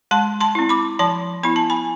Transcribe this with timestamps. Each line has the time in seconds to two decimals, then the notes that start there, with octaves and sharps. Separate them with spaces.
0.11 G#3 A5 C6
0.40 A5 C6
0.55 C4 E4
0.69 B5 D6
0.99 F3 A5 C6
1.43 B3 E4 B5
1.56 A5
1.70 G#5 B5